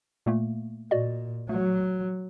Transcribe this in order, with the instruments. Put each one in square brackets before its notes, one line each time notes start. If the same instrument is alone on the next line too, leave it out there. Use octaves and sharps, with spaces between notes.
[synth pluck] A#2 A3 A#3
[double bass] A#2 [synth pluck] F#4 D5 D#5
[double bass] F#3 [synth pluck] A3